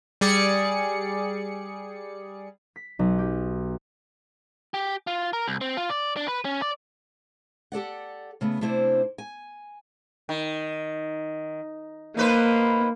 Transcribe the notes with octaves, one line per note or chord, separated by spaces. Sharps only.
G3 G#4 D5 C#7
B6
B1
G4
G4
F4
A#4
C2
C4
F4
D5
D4
B4
C#4
D5
G4 A4 D5 F#5
C#3 A3 B3
C3 A3 D4 E4 C5
G#5
D#3
A#3 D#4 B4 C5